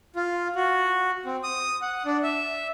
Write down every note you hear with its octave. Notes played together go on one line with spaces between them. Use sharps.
F4
F#4
C4
D#6
F#5
D4
E5